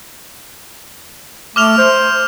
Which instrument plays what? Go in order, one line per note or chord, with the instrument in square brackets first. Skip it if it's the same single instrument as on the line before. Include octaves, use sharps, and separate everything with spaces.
[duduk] A3 [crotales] D6 F6 F7
[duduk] C5